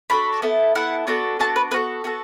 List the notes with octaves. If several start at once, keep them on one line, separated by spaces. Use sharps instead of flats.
D4 F#4 A4 B5
B3 E4 A4
B3 E4 A4 F#5
B3 D4 F#4 A4
B3 D4 F#4 A4 A5
B4
B3 F#4 A4 B4
B3 F#4 A4